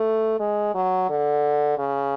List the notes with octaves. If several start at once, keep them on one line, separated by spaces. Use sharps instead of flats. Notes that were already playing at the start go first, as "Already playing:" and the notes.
Already playing: A3
G#3
F#3
D3
C#3